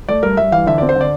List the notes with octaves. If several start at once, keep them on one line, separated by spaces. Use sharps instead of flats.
A3 D5
G2 A#4
G2 E5
E3 F5
D3 E5
C4 D5
C5
D3
D5